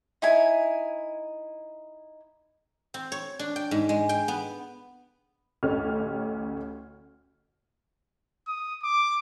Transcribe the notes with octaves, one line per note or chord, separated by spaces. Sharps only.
D#4 E4 G#5
C4
C#5
D4
G5
G#2
G#3
G5
B3
A1 D2 C#4 G4 A4 F6
D#6
D6